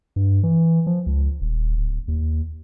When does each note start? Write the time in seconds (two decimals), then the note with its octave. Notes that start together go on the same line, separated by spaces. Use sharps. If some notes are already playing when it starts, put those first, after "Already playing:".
0.16 G2
0.43 E3
0.87 F3
1.06 C#2
1.41 D#1
1.77 D1
2.08 D#2